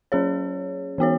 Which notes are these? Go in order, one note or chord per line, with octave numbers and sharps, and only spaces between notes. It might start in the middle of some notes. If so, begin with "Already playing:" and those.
F#3 C#4 G#4 C#5
E3 B3 F#4 C#5